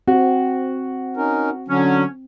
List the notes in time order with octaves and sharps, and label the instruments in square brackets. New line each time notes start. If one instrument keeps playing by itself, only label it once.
[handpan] C4 [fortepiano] F#4
[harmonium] C#4 D#4 A#4
[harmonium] D3 F#3 [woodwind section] C#4